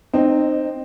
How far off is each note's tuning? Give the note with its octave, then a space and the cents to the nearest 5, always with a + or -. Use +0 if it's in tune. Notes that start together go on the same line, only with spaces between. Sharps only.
C4 +0 D#4 -30 D#5 -10